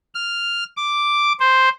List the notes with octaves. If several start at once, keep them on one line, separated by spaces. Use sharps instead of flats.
F6
D6
C5